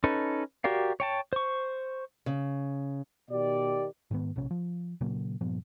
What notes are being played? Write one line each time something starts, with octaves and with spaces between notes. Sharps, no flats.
C#4 D#4 A4 B4
F#4 G4 A#4 D5 F5
C#5 G5 A5
C5 C#6
C#3
B2 D#3 G4 D5
G#2 D#3 B3
A#1 C3 C#4
F3
A#2 C#3 F#3 A#3
G2 A#2 F3 B3